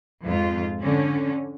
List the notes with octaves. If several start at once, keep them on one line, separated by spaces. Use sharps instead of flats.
F2 G#2 F4
D3 C#4